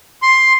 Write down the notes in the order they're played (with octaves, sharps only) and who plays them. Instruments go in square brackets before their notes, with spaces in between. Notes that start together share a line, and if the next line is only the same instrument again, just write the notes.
[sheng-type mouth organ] C6